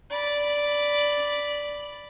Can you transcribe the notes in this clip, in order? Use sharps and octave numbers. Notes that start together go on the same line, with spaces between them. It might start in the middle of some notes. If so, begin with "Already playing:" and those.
D5 B5